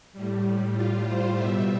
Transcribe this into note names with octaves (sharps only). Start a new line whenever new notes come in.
A2 G3
F4
C5
B2 G3 E5